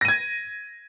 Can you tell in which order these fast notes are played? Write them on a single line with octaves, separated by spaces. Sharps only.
A#6 D#7 G#6